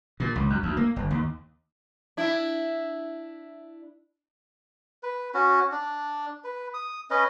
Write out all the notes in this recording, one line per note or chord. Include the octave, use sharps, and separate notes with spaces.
A#2
C#2
F#2
D2
A#3
G1
D#2
D4 E4
B4
C#4 F#4
D4
B4
D#6
C#4 B4 D#5